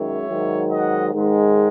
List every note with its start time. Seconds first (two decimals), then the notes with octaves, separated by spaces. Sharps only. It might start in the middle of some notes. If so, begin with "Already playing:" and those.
Already playing: F#2 D#3 G#3 C#5 E5
0.29 G#2 D#3 F#3
0.71 D#5 F#5
1.13 G#2 D#3 G#3